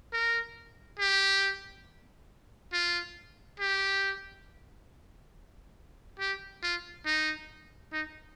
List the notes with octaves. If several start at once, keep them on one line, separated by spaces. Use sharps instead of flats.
A#4
G4
F4
G4
G4
F4
D#4
D#4